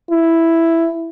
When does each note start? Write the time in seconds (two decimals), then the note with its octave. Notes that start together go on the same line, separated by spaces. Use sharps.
0.10 E4